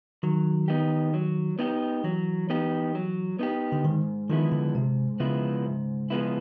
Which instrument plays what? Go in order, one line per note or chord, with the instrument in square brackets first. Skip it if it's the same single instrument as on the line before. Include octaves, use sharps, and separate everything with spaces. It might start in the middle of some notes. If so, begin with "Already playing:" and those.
[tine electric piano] D#3 [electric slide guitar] F#3
[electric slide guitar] B3 D#4 G4
F#3
B3 D#4 G4
[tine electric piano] E3 [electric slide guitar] F#3
[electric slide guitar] B3 D#4 G4
F#3
B3 D#4 G4
[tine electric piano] D3
[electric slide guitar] G#2 [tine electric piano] D#3
[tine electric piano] D#3 [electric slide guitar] F3 G#3 B3 E4
[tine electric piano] D3
[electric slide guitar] G#2 [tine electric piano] C3
[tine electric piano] C#3 [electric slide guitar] F3 G#3 B3 E4
[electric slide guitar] G#2
F3 G#3 B3 E4